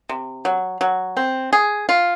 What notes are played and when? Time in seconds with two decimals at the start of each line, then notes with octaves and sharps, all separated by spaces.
0.09 C3
0.45 F#3
0.81 F#3
1.17 C4
1.53 G#4
1.89 F4